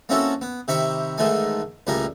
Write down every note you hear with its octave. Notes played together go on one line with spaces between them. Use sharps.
A#3 C4 C#4 E4 F#4 A4
B3
C3 D#3 G4 E5 B5 C#6
G#2 D#3 E3 G#3 A3 G#5
C#2 A2 G3 A#3 A#4 G#5